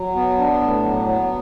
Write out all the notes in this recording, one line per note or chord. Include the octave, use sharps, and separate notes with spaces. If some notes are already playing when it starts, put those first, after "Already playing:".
Already playing: F#3
B3
D4
A2
F#3
B3